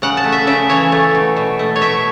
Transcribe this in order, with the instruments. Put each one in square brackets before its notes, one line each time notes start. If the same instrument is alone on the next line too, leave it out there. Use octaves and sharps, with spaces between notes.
[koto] C#3 F#5
A5
A3
E5
C#3 E5
E3 C#5
A3
B2
B2
A3
C#5
B2 E5